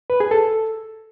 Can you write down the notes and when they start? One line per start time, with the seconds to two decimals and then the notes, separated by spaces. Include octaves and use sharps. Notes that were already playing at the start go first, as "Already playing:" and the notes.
0.10 B4
0.20 G#4
0.31 A4